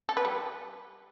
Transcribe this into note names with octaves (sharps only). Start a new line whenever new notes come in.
A4
B4
G3